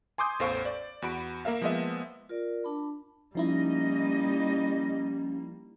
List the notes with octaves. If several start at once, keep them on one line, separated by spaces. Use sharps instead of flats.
G#5 C6 D6 D#6 G6
A1 E2 A4 C5 F5 C#6
D5
E2 F#4 B5 D7
A#3 A#4 E5 F5
F3 G#3 A#3 B3 D#5 E5
F4 A#4 D5
D4 A5 B5
F3 G3 A#3 C#4 D#4 E4 D#5